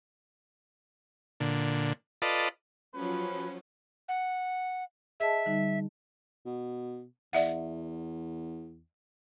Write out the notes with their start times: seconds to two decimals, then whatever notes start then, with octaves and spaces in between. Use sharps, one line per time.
1.40 A#2 D3
2.22 F4 A4 B4 D5 D#5
2.95 F3 F#3 C#4 B4
4.09 F#5
5.20 G#4 D#5 E5 A5
5.46 D3 G3 D#4
6.45 B2
7.33 E2 D5 E5 F#5